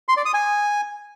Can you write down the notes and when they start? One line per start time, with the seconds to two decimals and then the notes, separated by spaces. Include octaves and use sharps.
0.09 C6
0.17 D5
0.25 D#6
0.34 G#5